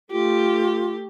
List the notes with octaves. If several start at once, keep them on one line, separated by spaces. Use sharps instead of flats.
A3 F4 G4